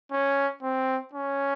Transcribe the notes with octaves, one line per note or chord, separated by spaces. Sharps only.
C#4
C4
C#4